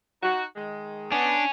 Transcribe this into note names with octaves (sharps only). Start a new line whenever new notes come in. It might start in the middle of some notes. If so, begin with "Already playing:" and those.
D#4 F#4
D#3 G#3
B3 C#4 D4